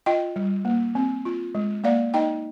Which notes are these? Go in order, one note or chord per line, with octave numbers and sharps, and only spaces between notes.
F4 D#5 G5
G3
A#3
C4
F4
G#3
A#3 D5 F5
D#4 D#5 G5